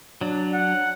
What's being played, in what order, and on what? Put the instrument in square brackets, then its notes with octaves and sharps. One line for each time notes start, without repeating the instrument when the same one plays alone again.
[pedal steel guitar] F#3 D4
[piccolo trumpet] F#5